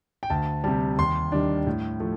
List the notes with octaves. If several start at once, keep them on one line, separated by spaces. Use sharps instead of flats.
G5
D2 A5
C3 G3 A5
D#2 C6
D#3 G3 D4
A2
F3 A3